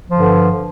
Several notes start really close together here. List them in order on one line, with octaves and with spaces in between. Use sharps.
F3 D3 G2